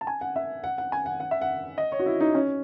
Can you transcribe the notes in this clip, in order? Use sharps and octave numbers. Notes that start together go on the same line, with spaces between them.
A5
G#5
F#5
E5
F#5
F#5
G#5
F#5
F#5
E5
F#5
D#5
C#5
F#4
E4
D#4
C#4